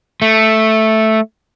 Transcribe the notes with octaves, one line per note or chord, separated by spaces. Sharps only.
A3